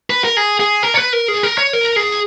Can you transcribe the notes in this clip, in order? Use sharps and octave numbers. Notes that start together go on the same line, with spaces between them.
B4
A#4
G#4
G#4
A#4
C#5
B4
A#4
G#4
A#4
C#5
A#4
G#4